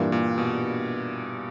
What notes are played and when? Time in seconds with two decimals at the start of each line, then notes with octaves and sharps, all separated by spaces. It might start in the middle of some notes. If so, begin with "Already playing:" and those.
Already playing: G2 A#2 E3 A#3 D4
0.12 A#2
0.38 B2